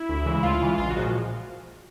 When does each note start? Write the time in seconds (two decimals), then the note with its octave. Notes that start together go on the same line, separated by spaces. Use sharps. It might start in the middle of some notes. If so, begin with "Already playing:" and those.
Already playing: E4
0.09 D2
0.25 C#3 E3 G#3
0.43 D2 F4
0.61 C#3 E3 G#3
0.78 A#1 F4
0.90 F#4
0.96 A#2 F3 G#3